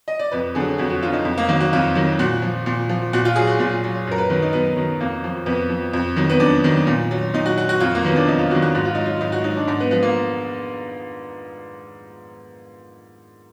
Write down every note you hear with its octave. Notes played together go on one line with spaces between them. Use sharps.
D#5
D5
F2 B4
D3 F#3 G#4
F2 F#4
F#4
D3 F#3 F4
D#4
F2
A#3
D#3 F#3 A#3
F#4
F2 F4
D#3 F#3
A#2 F#4
F3
A#2
F3
A#2 F#4
F4
F#3 G#4
F#4
A#2 F4
F#3
F#2 A#4
B4
D#3 F#3 B4
D#4
F#2 B3
D#3 F#3
F2 A#3
F3
F2 B3
F3
F2
D#3 F#3
B3
F2 D4
D#3 F#3
A#2
F#3
A#2 D#4
F#4
F#3 F#4
F#4
F2 F4
A#3
D#3 F#3 B3
D4
F2 D#4
F4
D#3 F#3 F#4
F#4
G#2 F#4
F4
F#3 D#4
F4
G#2 D#4
F#4
F#3 D#4
D4
G#2 D4
B3
F3 B3
A#3